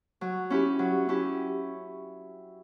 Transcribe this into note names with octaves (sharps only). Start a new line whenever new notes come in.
F#3
C#4 E4 G4
F#3
C#4 E4 G4